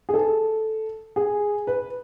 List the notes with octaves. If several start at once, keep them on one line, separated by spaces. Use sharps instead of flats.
G#4
A4
G#4
B4